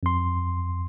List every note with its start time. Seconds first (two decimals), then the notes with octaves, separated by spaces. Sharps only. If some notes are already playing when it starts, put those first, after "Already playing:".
0.03 F2 C6